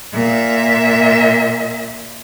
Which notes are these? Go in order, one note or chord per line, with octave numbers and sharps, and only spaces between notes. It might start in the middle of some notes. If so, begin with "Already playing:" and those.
A#2 E5